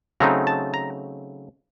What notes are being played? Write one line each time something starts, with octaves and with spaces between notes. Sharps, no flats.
C#3 F#3 A3 C4 D#4 A#5
A5
A#5